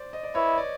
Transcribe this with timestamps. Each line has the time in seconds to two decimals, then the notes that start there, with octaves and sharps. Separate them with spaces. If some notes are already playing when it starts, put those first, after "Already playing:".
Already playing: C5 D5
0.13 D#5
0.23 D5
0.34 E4 B4 C#5
0.47 D#5
0.58 D5